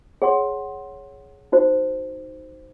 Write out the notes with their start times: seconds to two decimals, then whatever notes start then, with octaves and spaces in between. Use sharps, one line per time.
0.22 G#4 C#5 F#5 C6
1.52 D#4 F#4 C5